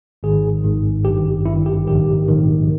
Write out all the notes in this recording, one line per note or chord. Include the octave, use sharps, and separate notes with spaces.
G#1 G#2 D#3 G#4
G#1 G#2 D#3
G#1 G2 D#3 G4
G#1 G2 D#3 E4
G4
A#1 G#2 D#3 G4
A#1 G#2 D#3